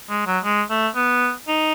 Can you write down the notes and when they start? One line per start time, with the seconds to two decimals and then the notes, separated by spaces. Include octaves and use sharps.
0.10 G#3
0.27 F#3
0.44 G#3
0.70 A3
0.95 B3
1.48 D#4